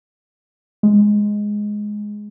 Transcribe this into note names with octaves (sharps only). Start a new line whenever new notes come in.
G#3